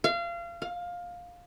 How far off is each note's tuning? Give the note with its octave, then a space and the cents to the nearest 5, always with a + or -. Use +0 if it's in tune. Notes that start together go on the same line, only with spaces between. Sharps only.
F5 -30
F5 +15